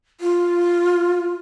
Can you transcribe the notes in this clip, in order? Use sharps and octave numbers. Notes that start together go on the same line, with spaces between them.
F4